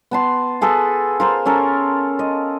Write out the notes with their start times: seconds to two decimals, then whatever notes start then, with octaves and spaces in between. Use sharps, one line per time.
0.11 B3 A5 C6
0.61 F4 G#4 A4 B4
1.20 F4 A#4 C5
1.46 C#4 A4 A#4
2.19 D#5